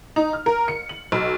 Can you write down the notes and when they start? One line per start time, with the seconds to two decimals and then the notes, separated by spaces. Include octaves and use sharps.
0.16 D#4
0.33 F6
0.46 A#4
0.68 C#7
0.89 F#7
1.12 B1